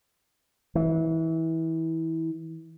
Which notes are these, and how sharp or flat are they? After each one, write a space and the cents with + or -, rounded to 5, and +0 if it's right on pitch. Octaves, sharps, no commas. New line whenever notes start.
E3 -25